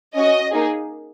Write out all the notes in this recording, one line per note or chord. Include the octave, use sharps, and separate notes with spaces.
C#4 F#4 D#5
A#3 D#4 G#4